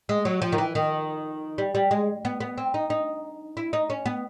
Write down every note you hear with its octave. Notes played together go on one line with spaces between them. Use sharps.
G#3
F#3
F3
D#3
E3
D#3
G3
G3
G#3
B3
B3
C4
D#4
D#4
E4
D#4
C#4
B3